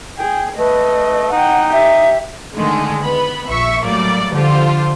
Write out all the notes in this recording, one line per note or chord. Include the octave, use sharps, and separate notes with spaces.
G#4 G5
A3 B4 D#5
D#4 F#5 G5
G4 E5
D3 D#3 G#3 A3
B3 B5
A#1 E5 C#6
A2 F#3 G3 A3 A#3 D5
D3 F3 F4 G4 A4 C5